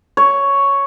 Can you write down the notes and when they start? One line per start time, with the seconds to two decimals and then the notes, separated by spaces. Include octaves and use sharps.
0.17 C#5